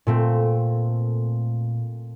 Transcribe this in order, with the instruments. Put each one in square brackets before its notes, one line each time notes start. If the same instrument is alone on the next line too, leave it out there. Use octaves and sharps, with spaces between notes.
[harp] A#2 A3 C4